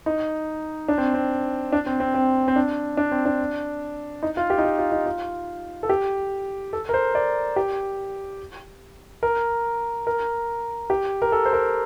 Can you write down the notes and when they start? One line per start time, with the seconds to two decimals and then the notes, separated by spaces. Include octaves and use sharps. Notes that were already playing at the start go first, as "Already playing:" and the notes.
0.06 D#4
0.88 D4
0.98 C4
1.14 C4
1.73 D4
1.86 C4
2.00 C4
2.14 C4
2.48 C4
2.56 D4
2.97 D4
3.12 C4
3.26 D4
4.23 D#4
4.37 F4
4.50 G4
4.58 D#4
4.64 F4
4.78 F4
4.92 D#4
5.06 F4
5.83 A4
5.89 G4
6.73 A4
6.89 A#4
6.94 C5
7.15 D5
7.56 G4
9.23 A#4
10.07 A#4
10.90 G4
11.22 A#4
11.32 A4
11.45 C5
11.53 A#4